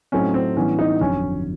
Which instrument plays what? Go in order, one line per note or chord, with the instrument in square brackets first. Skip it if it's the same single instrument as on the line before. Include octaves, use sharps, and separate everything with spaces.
[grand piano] A2 F#3 A3 C4 D#4 [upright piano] C#4
[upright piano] C4
[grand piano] A2 E3 G3 B3 D4 [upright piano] C#4
[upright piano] D#4
[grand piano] G1 F2 D3 F#3 [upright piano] C#4